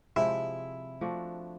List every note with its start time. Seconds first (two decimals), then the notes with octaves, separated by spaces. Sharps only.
0.16 C3 F3 G#3 C4 E4
1.01 F3 A3 D4 F#4